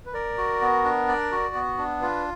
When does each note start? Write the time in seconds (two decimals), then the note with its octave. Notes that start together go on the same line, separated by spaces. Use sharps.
0.06 B4
0.14 A#4 D5
0.37 F#4
0.61 B3
0.84 D4
1.08 D5
1.32 F#4
1.55 B3
1.78 D4
2.01 F4 B4